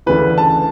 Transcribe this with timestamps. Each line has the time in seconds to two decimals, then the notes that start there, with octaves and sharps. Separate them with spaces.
0.06 D2 C#3 E3 B4
0.38 A5